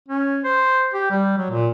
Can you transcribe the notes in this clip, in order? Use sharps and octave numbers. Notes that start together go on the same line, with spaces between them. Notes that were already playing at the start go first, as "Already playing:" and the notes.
C#4
C5
G4
G3
F#3
A#2